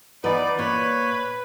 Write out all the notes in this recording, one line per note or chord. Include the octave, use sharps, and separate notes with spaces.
E3 B3 D#4 B4 D5
A#2 B4 C#5